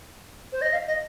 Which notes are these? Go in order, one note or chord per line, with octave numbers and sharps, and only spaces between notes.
C5
D#5
F5
D#5